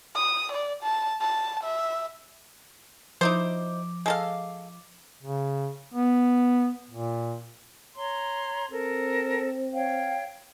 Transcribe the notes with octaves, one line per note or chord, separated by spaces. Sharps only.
D#6
D5
A5
A5
E5
F3 D#4 E4 C5 D6
G#3 A4 F5
C#3
B3
A#2
C#5 A#5 C6
C4 A4 A#4
C#5 F5 G5